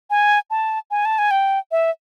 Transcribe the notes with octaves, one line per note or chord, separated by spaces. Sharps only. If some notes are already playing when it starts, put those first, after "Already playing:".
G#5
A5
G#5
A5
G#5
G5
E5